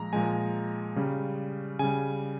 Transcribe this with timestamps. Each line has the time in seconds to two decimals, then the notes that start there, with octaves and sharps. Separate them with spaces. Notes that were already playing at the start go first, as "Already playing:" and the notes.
Already playing: A#2 F3 G#3 A#5
0.13 A#2 F3 G#3 G#5
0.96 C#3 G3
1.79 C#3 G3 G#5